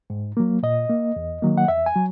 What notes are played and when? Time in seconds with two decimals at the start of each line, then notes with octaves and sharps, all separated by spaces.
0.10 G#2
0.37 F#3 A#3
0.63 A#2 D#5
0.90 A#3
1.16 E2
1.42 D#3 F#3 A#3
1.58 F#5
1.68 E2 E5
1.86 G#5
1.96 F#3